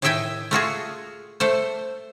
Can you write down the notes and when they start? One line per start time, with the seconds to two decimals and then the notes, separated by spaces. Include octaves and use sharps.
0.02 A2 D#3 D#5 E5 G5 G#5
0.51 A3 F4 F#4 G#4
1.40 A3 A4 C5